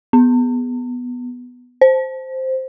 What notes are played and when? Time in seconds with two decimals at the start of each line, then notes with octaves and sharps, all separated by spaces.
0.13 B3
1.81 C5